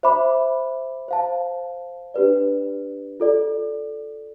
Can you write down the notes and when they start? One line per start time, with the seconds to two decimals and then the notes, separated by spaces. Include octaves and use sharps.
0.03 C5 E5 B5 D6
1.08 C5 F5 A5
2.14 D4 G4 B4 D5
3.20 F4 A4 D5